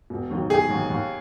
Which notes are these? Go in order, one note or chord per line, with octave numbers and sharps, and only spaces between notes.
E1
D#2 D#3 F#3
E1 G#4
D#2 D#3 F#3
D#2